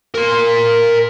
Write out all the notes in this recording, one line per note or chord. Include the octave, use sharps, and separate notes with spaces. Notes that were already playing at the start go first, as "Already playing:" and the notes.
A#4 C6